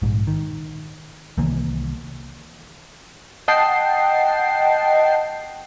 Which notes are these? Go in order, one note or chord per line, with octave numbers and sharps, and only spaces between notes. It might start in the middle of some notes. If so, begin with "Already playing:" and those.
A#1 G#2
D#3
C2 D#3 E3 A#3
D#5 F#5 G5 A5 C7